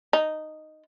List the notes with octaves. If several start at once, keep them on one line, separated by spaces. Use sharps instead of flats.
D#4